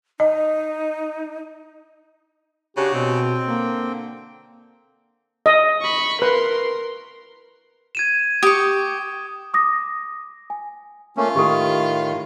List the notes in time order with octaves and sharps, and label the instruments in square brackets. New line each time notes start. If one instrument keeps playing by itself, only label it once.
[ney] D#4 [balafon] D#5
[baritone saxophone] C#3 [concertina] D4 F#4 [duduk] G4
[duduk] B2 [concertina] C4 G5
[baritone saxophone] D3 [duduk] A#3
[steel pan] D#5
[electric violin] B5 C#6
[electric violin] A#4 C6 [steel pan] B4
[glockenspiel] G#6 D#7 E7
[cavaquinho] G4 C#6 [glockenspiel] D#6
[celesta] D6 D#6 A#6
G#5
[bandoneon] A3 A#3 C#4 [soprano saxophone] F4
[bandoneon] A2 D#3 [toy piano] G4 A4